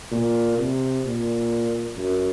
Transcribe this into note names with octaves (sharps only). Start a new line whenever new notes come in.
A#2
C3
A#2
F#2